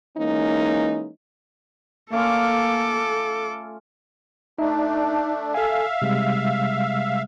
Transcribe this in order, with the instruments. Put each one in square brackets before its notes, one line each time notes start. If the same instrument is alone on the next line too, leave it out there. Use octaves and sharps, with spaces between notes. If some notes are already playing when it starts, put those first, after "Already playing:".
[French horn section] E3 G#3 A#3 C#4 D#4
[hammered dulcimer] A3 C#4 F4 [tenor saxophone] A#3 [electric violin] A4 D6
[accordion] A3 D4 [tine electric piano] D#4 E5
[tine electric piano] A4 G#5 [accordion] E5 F5
[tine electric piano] C3 G3 G#3